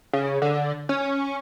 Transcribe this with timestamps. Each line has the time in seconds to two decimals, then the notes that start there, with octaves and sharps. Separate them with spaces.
0.13 C#3
0.42 D3
0.89 C#4